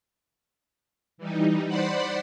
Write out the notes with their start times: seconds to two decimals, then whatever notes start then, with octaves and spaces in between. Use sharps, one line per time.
1.18 E3 G3 D#4
1.68 C5 D5 F#5 B5 C6